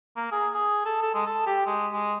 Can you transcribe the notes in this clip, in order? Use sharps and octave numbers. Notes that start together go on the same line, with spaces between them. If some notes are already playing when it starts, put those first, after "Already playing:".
A#3
G#4
G#4
A4
A4
G#3
A4
G4
G#3
G#3